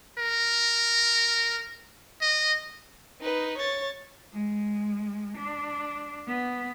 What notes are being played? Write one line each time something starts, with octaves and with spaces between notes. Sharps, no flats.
A#4
D#5
D#4 B4
C#5 A6
G#3
D4
B3